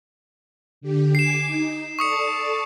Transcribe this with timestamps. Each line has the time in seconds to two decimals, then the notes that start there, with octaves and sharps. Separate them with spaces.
0.81 D3 G4
1.15 G#5 D6 C7 E7
1.46 D#4
1.99 A4 D5 A5 C#6 D#6 C#7